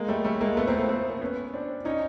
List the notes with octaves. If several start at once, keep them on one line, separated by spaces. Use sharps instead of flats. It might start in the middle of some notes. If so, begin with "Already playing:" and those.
Already playing: G#3 A#3
G3 A3
G3 A3
G#3 A#3
A3 B3
A#3 C4
A3 B3
A#3 C4
C4
B3 C#4
C4 D4
C#4 D#4